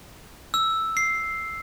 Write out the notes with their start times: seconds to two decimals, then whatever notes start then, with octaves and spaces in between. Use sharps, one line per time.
0.54 E6
0.97 C7